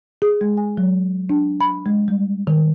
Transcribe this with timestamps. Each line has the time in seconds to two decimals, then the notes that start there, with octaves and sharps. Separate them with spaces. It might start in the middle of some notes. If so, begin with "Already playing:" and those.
0.22 G#4
0.41 G#3
0.57 G#5
0.77 F#3
1.30 D4
1.61 B5
1.86 G#3
2.08 G3
2.47 D#3